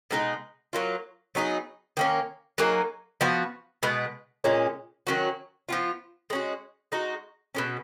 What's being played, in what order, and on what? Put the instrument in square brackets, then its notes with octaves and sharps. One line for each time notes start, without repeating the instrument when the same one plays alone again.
[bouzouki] B2 G#3 D#4 G#4
F#3 A#3 F4
F#3 B3 D#4 G#4
D#3 A#3 C#4
F#3 A#3 D#4 G#4
F3 B3 F#4
B2 G#3 B3
A#2 G#3 C#4
D#3 F#3 C#4 F#4
F3 B3 F4
G#3 C#4 F#4
G#3 D#4 F#4
B2 G#3 C#4